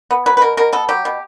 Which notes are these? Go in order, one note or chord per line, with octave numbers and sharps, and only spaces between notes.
B3
F#3 B4
B4
B2 A#4
B2 A#4
B3 A4
F#3 G4
B2